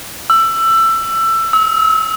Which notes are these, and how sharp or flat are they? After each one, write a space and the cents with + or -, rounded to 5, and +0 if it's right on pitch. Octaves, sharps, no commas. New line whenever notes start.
E6 +20
E6 -30